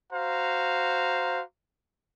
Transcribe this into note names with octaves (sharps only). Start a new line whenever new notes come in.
F#4 C5 F5 A#5